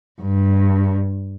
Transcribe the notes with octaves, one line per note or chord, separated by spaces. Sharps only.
G2